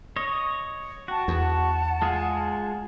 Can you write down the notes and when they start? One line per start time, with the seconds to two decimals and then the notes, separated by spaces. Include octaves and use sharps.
0.16 C#5 D#5
1.08 F#4 G5 A5
1.28 E2 F#5 A5
2.02 G#3 F4 G#4